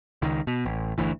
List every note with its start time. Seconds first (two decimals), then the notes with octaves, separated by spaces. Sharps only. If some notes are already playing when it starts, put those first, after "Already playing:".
0.22 C#2 D#3
0.47 B2
0.65 A1
0.98 G1 D2 E3